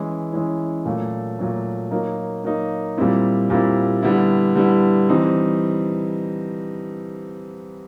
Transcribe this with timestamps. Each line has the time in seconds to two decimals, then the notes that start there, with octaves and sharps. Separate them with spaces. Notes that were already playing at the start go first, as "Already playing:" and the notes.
Already playing: E3 G#3 C#4 E4
0.33 E3 G#3 C#4 E4
0.86 A#2 F#3 A3
1.39 A#2 F#3 A3
1.91 F#3 A#3 D#4
2.44 F#3 A#3 D#4
2.97 A#2 G3 C4 E4
3.50 A#2 G3 C4 E4
4.03 D3 G3 B3 E4
4.55 D3 G3 B3 E4
5.09 E3 G3 C4 D#4